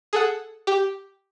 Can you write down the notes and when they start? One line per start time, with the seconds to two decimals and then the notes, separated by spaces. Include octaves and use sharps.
0.13 G#4 A4 F#5
0.67 G4